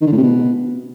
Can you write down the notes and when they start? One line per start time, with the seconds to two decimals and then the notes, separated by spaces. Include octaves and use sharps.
0.01 D#3
0.07 D3
0.12 A2
0.18 C3
0.23 B2